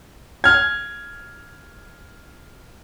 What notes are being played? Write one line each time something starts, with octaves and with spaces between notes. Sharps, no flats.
F6 G#6